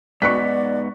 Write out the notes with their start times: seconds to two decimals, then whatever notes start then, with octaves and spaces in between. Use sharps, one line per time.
0.22 G#2 B3 D#4 D5 C#6 F#6 B6